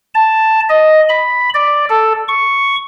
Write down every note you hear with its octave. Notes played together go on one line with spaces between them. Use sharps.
A5
D#5
B5
D5
A4
C#6